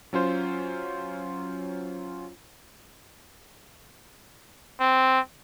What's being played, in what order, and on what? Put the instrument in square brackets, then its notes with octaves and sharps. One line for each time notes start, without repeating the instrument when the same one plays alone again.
[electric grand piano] F#3 C#4 F4 C5
[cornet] C4